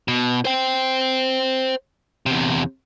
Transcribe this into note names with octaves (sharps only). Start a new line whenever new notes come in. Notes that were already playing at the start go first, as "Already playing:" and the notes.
B2
C5 G5
E2 C3